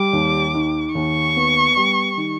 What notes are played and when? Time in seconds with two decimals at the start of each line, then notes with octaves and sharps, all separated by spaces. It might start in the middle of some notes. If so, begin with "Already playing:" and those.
Already playing: G3 D6
0.13 D#2
0.54 D#3
0.95 D#2 C#6
1.36 B3
1.76 G3
2.17 D#3